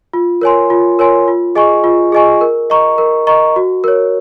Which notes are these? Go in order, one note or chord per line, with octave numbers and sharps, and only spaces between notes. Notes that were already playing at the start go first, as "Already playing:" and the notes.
F4
A#4 C#5 G#5 C6
F4
A#4 C#5 G#5 C6
F4
G#4 D#5 G#5 C#6
F4
G#4 D#5 G#5 C#6
A#4
D#5 A#5 C#6
A#4
D#5 A#5 C#6
F#4
A#4 C#5